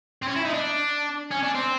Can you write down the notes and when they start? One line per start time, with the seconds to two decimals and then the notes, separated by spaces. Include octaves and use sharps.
0.23 C4
0.28 C#4
0.36 E4
0.45 D#4
0.54 D4
1.31 C#4
1.43 D4
1.54 C4